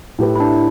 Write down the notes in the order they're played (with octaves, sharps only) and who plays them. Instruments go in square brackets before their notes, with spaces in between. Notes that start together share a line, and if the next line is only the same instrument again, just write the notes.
[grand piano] A2 A3 G4 B4
[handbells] E4
D4